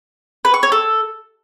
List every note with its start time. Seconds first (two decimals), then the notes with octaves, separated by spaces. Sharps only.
0.45 B4
0.54 C#6
0.63 C#5
0.72 A4